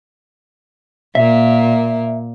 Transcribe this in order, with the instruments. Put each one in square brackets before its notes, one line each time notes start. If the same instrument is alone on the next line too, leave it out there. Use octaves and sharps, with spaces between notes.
[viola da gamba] A#2 A#3 [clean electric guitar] E5